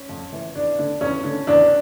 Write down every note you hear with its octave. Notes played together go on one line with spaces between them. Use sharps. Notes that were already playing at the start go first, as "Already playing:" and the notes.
Already playing: C#4
F2
E3
E2 D4
D3
E2 C#4
D3
E2 D4